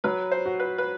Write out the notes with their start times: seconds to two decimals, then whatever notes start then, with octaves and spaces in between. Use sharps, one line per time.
0.04 F#3 B4
0.32 C5
0.46 F#4
0.60 B4
0.78 B4